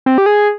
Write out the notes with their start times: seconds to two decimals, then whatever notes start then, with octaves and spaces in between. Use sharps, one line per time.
0.06 C4
0.18 G4
0.26 G#4